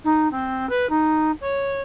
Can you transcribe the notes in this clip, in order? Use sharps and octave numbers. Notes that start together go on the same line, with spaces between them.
D#4
C4
B4
D#4
C#5